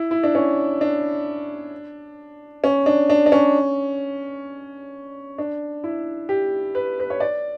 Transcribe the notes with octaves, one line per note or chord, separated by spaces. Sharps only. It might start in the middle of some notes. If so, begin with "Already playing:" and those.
Already playing: E4
E4
D4
C#4
D4
C#4
D4
D4
D4
C#4
D4
E4
G4
B4
B4
C#5
D5